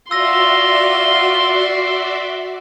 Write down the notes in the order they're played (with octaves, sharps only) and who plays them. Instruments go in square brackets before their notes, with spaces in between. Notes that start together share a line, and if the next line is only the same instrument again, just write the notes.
[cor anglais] F4 [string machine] F#4 D5 E5 [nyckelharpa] C6 [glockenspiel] E6 A#6